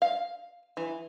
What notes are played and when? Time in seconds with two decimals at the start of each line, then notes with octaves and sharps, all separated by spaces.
0.02 F5
0.77 E3